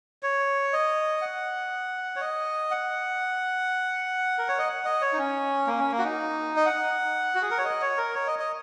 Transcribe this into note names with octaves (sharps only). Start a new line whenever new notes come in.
C#5
D#5
F#5
C#5
D#5
F#5
A#4
C#5
D#5
F#5
D#5
C#5
D#4
C#4
A#3
C#4
A#3
F#4
D#4
D#5
F#5
F#4
G#4
A#4
C#5
D#5
C#5
A#4
C#5
D#5
D#5